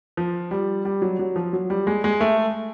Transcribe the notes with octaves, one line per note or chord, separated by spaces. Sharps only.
F3
G3
G3
F#3
F#3
F3
F#3
G3
G#3
G#3
A3